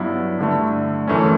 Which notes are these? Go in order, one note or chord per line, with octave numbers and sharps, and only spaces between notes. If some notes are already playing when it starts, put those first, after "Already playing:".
Already playing: G2 F#3 B3 E4
G2 D3 A3
F#2 E3 A3 C#4